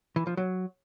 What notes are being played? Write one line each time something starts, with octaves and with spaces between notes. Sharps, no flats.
E3
F3
F#3